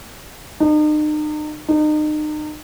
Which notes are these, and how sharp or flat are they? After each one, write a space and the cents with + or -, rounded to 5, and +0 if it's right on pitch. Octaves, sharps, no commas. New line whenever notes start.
D#4 -40
D#4 -35